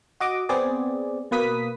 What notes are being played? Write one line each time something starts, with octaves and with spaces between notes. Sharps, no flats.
F#4 D#5 D6
B3 C4 G#4 D5
B2 A#3 B4 D#6 B6